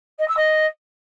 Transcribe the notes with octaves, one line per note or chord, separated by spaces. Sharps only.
D#5
E6
D#5